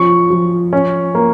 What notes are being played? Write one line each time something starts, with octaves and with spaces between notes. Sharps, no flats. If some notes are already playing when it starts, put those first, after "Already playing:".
Already playing: F3 C#4 C#6
F3
C#4
A#3